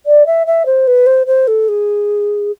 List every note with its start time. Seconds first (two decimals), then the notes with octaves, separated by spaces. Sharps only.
0.06 D5
0.26 E5
0.47 E5
0.66 C5
0.87 B4
1.06 C5
1.27 C5
1.47 A4
1.68 G#4